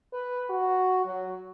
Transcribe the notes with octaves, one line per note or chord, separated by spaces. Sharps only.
B4
F#4
F#3